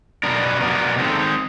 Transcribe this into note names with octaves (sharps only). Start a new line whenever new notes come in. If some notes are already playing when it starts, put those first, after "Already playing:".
B2 F#3 B3 D4 A#4
B4
B2 F#3 B3 D4 A#4
D#3 G#3 C4 A4